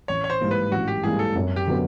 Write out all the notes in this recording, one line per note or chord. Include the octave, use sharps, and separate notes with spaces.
A1 C#5
C#5
C5
G#2 E3 G3 A#3
B4
A1 F#4
G4
G#2 E3 G3 A#3 G#4
A4
F#2
G4
D3 F#3 B3